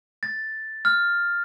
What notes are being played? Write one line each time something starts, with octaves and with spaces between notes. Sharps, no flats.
A6
F6